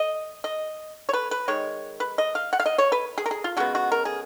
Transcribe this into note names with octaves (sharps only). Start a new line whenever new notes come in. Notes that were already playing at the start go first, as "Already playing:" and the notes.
Already playing: D#5
D#5
C#5
B4
B4
D#3 G#3 C#5
B4
D#5
F5
F#5
F5
D#5
C#5
B4
G#4
A#4
G#4
F4
C#3 G#3 B3 F#4
F#4
A#4
G#4